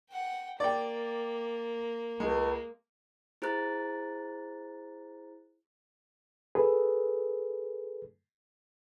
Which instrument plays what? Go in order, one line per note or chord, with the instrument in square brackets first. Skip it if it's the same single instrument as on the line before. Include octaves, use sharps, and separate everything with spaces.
[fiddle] F#5 G5
[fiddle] A#3 [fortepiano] D5 G5
[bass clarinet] C#2 [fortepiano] G#3
[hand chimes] E4 G#4 C5 A#5 F#6 A6
[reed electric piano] G#4 A4 B4